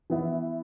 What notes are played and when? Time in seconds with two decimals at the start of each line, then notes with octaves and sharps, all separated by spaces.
0.10 E3 B3 E4